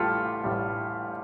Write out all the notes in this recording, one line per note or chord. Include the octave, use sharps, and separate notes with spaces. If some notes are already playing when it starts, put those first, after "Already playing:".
Already playing: A1 A2 G3 F4 G4 A4
A1 A2 G3